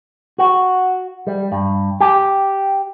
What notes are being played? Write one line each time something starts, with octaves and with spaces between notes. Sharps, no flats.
F#4
G3
G2
G4